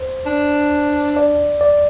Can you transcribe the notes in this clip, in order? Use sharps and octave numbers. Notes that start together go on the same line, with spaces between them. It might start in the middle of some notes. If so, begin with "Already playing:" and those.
Already playing: C5
D4
D5
D5